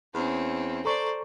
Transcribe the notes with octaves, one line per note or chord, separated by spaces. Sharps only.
E2 C4 C#4
A4 C5 D5 A#5 C#6